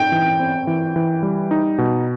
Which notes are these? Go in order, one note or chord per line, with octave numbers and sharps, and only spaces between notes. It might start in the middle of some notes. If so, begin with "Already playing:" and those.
Already playing: D#4 G5
E3
C4
E3
E3
G3
D#4
B2